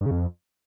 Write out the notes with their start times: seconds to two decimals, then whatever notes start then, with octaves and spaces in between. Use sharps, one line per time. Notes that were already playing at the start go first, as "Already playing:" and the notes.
0.01 G2
0.06 C#3
0.11 F2